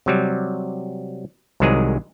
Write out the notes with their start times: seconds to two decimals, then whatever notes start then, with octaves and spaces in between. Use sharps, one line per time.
0.06 C3 F#3 G3
1.60 C2 C3 D#3 F#3 G#3 G#4